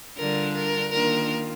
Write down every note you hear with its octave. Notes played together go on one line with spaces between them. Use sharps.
D3 G3 D4 F4 A#4
A#4
D#3 A#3 D4 F4 A#4